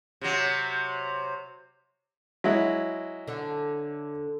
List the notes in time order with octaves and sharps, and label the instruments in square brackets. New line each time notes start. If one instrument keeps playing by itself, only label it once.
[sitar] C3 F#3
[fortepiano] F#3 G#3 E4
[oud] D3